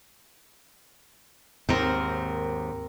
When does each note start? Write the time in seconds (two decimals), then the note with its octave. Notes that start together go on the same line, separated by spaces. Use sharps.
1.69 D#2 G#2 C4 A#4